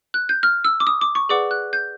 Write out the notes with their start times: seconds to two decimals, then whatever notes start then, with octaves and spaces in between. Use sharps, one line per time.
0.14 F#6
0.29 G6
0.43 F6
0.65 E6
0.80 D6
0.87 D#6
1.01 D6
1.15 C#6
1.29 G#4 B4 D5 F#5 D6
1.51 F#6
1.73 G6